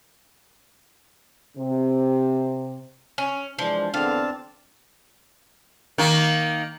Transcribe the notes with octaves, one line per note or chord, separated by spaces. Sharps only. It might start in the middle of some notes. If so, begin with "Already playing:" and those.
C3
C#4
E3 F3 G#3 D4
E2 D3 C4 D4 F5 A5
D#3 A#3